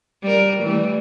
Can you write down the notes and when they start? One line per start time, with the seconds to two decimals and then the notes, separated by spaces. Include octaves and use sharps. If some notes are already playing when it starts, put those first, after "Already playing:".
0.23 G3 A#4
0.63 E3 G3 A3